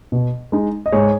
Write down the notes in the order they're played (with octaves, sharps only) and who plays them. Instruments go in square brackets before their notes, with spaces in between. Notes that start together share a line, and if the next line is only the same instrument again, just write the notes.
[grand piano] B2
G#3 D#4
D#5
G#2 G#4 C#5